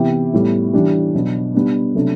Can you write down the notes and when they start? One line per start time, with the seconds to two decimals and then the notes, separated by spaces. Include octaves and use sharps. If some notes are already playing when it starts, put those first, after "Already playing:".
Already playing: C3 E3 B3 E4 G4
0.33 A2 G3 B3
0.73 E3 G3 D4 G4
1.14 B2 F#3 B3 D4
1.55 G3 B3 D4
1.95 C3 F#3 A3 D4